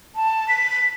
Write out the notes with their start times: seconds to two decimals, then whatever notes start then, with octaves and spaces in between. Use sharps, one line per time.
0.15 A5
0.48 B6